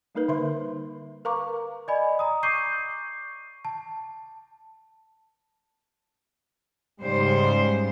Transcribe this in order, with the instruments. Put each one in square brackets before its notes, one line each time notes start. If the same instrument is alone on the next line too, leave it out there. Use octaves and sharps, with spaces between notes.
[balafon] G3 A#3 D#4 A#4 B4
D3 C5 E5 C6
A#4 B4 F5 A#5 C#6 D6
[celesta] D5 D#5 G#5 B5
A#5 D#6
C#6 D6 G6 C7 D#7
A5
[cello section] G#2 C#3 G3 C5